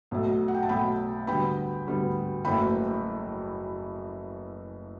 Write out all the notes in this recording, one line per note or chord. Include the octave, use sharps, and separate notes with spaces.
B1 B2 A3
F#5
G5
A5
B1 B2 A3 G5 B5
D2 D3 G3 B3 G5 B5
D2 D3 G3 B3
F#1 F#2 E3 A3 G5 B5